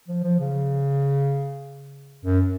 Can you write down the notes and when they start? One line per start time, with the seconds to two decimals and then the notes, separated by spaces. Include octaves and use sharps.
0.08 F3
0.24 F3
0.39 C#3
2.25 F#2